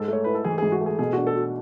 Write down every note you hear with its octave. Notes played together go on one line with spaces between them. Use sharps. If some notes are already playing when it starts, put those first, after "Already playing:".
Already playing: G#2 A4
A3 C#5
E4 B4
A4
E3 G#4
G#2 G#4
F#4
A3
G#4
B2 G#4
D4 F#4
A4
F#4